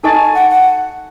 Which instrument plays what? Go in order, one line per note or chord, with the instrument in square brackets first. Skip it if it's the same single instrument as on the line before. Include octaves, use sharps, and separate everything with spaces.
[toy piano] D#4 A4 D#5 A5 C#6 [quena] G#5
[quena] F#5
F#5